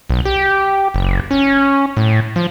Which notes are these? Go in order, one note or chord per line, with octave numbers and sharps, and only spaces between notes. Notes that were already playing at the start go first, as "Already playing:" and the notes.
B1
G4
F#1
C#4
A2
F3